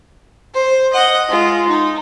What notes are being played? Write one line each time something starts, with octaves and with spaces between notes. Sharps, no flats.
C5
D#5 F#5
G#3 F4
D#4